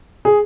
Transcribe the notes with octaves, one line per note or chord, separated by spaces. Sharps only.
G#4